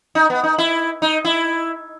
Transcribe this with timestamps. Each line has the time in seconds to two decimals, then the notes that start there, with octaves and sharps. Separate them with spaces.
0.15 D#4
0.30 B3
0.44 D#4
0.58 E4
1.02 D#4
1.25 E4